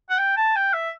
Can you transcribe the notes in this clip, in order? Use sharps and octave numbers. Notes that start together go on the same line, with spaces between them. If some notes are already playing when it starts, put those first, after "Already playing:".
F#5
G5
A5
G5
E5